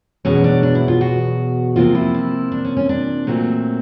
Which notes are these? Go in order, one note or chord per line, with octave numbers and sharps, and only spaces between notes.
E2 B2 F#3 C#4
D4
D4
E4
F4
F#4
C3 F3 A#3 F4
E4
E4
D4
C#4
C#4
D4
A#2 F#3 A3 C4